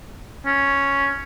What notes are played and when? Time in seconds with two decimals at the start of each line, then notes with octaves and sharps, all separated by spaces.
0.46 C#4